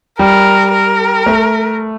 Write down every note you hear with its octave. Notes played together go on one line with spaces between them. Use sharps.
G3 A#4
A#4
A3